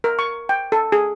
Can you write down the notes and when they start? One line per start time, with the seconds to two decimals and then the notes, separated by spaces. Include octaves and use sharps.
0.04 A#4
0.19 C#6
0.49 G5
0.72 A4
0.92 G#4